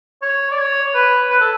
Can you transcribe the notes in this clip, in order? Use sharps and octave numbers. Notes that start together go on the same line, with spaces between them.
C#5
D5
C#5
B4
B4
A4